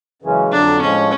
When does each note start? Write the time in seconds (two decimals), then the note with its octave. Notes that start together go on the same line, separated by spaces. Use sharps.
0.22 F#2 C#3 E3 G#3 C#4
0.51 F2 D3 F#3 D4
0.81 A2 F3 G#3 C#4